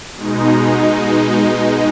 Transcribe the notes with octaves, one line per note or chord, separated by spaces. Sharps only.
B2 G#3 D#4